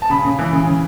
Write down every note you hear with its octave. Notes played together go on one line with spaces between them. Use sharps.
A5
C#3 B5
C#3
E3
C#3
C#3